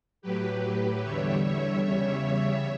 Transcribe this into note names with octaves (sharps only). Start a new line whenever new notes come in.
A2 F#3 G4 B4
E2 D3 G3 C#5 E5
C#5 E5
E2 C#3 G3 C#5 E5